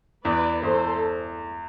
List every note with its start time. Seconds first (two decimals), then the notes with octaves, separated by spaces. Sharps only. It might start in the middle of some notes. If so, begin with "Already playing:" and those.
0.24 E2 B4 D5
0.63 E2 A4 C5